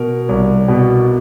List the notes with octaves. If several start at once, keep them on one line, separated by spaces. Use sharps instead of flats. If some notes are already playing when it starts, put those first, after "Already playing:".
Already playing: B2 A#4
C2
B2